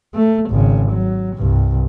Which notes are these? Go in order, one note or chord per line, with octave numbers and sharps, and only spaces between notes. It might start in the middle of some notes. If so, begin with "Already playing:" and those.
A3
G#1 C#3
F#3
C2 G2